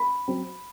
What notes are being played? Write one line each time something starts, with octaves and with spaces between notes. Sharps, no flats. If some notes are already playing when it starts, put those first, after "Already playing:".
Already playing: B5
F#3 C4